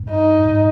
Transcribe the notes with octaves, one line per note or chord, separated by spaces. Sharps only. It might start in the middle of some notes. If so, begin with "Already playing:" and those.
Already playing: G2
D#4
G#2